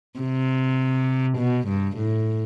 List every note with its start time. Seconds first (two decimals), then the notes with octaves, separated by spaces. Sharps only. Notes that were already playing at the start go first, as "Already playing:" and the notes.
0.20 C3
1.38 B2
1.68 G2
1.97 A2